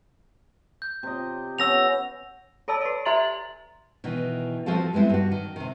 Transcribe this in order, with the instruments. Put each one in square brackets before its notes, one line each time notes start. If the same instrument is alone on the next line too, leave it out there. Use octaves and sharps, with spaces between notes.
[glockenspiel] G6
[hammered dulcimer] C3 D#5
[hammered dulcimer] B3 C#4 [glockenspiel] E6 A#6 F7
[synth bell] A4 C#5 D5 A5 E6 A6
B4 D5
G4 E5 A#5 C6 A6 F#7
[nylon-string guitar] B2 D#3 E3
F3 C4 F#4 A4 F5 A5
G3 G#3 B3 C4 E4
G2 F#4
D#3
C3 D#3